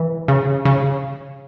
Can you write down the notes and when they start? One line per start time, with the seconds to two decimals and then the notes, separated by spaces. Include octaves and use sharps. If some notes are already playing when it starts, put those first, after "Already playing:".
Already playing: E3
0.28 C#3
0.65 C#3